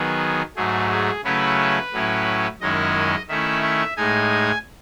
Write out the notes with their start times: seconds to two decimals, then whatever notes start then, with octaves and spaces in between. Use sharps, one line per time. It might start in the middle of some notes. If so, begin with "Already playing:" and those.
Already playing: D#3 F#3 B3 G#4
0.56 G#2 F#3 A3 G#4
0.90 G#4
1.24 C#3 F#3 A3 C#4 E4 B4
1.92 A2 F#3 C#4 E4
2.61 F#2 D#3 G#3 C#4 E4 D#5
3.28 D#3 A3 C#4 E4 E5
3.63 E5
3.97 A2 G#3 D#4 G#5